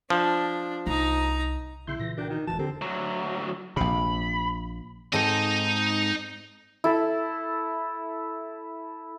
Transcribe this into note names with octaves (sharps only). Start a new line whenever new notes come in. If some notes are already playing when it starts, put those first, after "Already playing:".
F3 D4
C2 D#4 A#5
B1 C#3 E4 C6 G6
A#2 C#3 E3 A#6
D4 F#4 A#4 G5
D#3
E1 C#2 E3 F#4 A5
D3 C4 G4 A4 A#4
D2 F#3
A#1 C3 B5
G#2 C4 D#4 A4 D#5
E4 A4